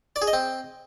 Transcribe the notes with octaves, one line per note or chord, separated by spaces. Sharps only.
D5
G#4
D#5
C4